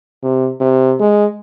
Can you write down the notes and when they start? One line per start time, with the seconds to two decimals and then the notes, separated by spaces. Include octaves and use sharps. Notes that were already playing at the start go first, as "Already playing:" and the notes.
0.23 C3
0.60 C3
1.00 G#3